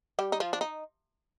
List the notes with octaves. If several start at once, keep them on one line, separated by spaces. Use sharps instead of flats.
G3 G4
D#4
F3 F4
D4
D#4